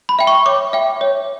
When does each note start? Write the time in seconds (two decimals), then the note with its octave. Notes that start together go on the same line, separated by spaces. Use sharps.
0.09 B5
0.19 E5 G5
0.27 C#6
0.46 C#5 D6
0.73 E5 G5
1.01 C#5